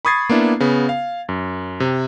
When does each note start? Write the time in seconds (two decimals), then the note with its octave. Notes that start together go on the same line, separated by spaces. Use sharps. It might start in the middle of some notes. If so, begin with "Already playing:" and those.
0.05 B5 C#6 D#6 G#6 A6 C7
0.30 A#3 B3 D4 E4
0.60 C#3 B3
0.89 F5
1.29 F#2
1.80 C3